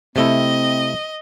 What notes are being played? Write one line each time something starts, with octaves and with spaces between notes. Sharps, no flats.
C3 A3 C4 E4 D#5